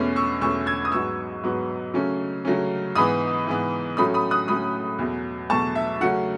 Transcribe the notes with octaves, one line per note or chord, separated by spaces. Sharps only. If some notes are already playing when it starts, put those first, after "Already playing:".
Already playing: E2 B2 A3 C#4
C#6 E6
E2 B2 A3 C#4 C#6 E6
E6 G#6
D#6
G#2 F#3 B3 C#6 E6
G#2 F#3 B3
C#3 F#3 A3 C#4
C#3 F#3 A3 C#4
G#2 E3 B3 B5 D#6
G#2 E3 B3
A2 F#3 A3 C#4 B5 D#6
B5 D#6
D#6 F#6
A2 F#3 A3 C#4 B5 D#6
E2 B2 F#3 A3
E2 B2 F#3 A3 A5 C#6
E5
C#3 F#3 A3 C#4 F#5